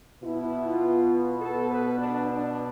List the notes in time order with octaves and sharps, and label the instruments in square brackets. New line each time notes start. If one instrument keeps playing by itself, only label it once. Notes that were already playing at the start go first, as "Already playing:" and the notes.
[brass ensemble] B2 B3 E4
F4
A4
B4
D4
D4